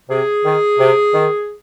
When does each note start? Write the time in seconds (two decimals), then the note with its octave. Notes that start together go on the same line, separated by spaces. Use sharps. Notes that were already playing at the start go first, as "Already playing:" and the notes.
0.09 C3 G#4
0.44 D#3
0.79 C3
1.13 D#3